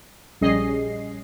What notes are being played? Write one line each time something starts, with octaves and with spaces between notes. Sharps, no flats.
A#1 G3 C#4 G#4 D#5 C7